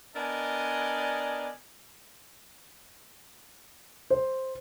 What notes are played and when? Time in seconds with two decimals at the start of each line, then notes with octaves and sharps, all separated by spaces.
0.15 B3 D4 A#4 D5 D#5 G#5
4.10 C5